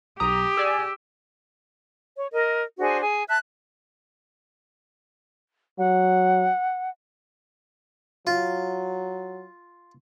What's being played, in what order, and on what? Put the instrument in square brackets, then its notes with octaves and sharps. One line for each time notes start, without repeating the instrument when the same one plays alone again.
[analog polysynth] B1 A#5 [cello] G4 [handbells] D#6
[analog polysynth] G#4 D5 G#5 [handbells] E6
[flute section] C#5
A#4 D#5
D4 F#4 G#4 C5
G#4
E5 A5 F#6
[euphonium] F#3 [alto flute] F#5
[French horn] F#3 [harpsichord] F4